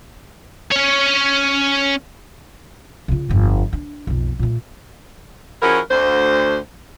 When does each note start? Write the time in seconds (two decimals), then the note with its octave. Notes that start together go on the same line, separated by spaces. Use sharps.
0.72 C#4 C#5
3.08 C#3 F4
3.29 G1 F2
3.73 D4
4.07 B1 F2
4.39 A#2 A3
5.62 F3 C#4 E4 F#4 G#4 A#4
5.91 D2 C5